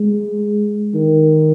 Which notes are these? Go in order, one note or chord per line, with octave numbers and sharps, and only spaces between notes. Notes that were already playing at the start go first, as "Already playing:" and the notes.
Already playing: G#3
D#3